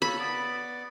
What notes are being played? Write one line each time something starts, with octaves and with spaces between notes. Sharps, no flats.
A#3 A4 C#5 B5
B3 D5